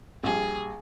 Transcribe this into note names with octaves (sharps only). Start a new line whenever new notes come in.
A#1 G3 G#4